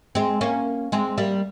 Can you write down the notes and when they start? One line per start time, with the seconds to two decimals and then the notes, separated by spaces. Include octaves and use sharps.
0.15 G#3 C4
0.41 A#3 C#4
0.92 G#3 C4
1.18 G3 A#3